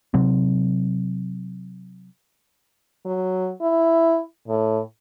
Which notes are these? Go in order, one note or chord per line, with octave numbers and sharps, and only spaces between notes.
C3 F#3 C4
F#3
E4
A2